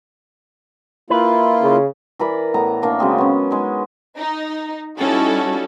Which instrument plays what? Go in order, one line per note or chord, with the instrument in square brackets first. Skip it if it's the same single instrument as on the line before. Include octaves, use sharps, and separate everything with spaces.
[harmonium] A#3 E4 F4 [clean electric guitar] B4
[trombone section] C#3
[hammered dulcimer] E3 A#4 D5 B5
A2 B3 A#5
A3 A#3 D4
C#3 F#3 G#3 C4
B3 C#4
G#3 D#4
[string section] D#4
G3 C#4 D#4 E4 F#4 A4